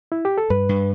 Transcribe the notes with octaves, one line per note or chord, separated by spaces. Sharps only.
E4
G4
A4
G2 B4
G2